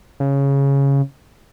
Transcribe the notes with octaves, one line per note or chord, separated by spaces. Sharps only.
C#3